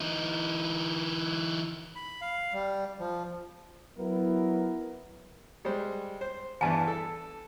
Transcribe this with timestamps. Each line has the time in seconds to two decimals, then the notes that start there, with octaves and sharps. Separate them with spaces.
0.01 E3 D#4
1.96 B5
2.21 F5
2.54 G3
2.99 F3
3.98 F#3 B3 E4 A#4
5.65 G3 G#3 C5
6.21 C5
6.61 E2 G2 E3 G#5 A5
6.88 A4